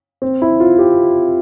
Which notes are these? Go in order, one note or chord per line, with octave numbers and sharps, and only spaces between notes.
C4
E4
F4
G4